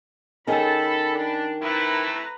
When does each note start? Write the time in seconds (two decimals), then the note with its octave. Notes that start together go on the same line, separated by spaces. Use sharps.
0.47 D#3 C#4 G#4 A4 B5
1.15 D4
1.62 C3 A3 E4 B4 A#5